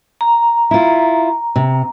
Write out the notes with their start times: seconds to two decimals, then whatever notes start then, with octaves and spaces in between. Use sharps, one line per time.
0.21 A#5
0.71 E4 F4
1.56 C3